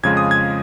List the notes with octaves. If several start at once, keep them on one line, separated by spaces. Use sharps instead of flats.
F2 C#3 G#3 F4 G#6
D#6
G#6